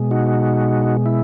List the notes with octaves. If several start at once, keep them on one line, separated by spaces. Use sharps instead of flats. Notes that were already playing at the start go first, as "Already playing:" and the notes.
Already playing: B2 G#3
D#4 F#4
E4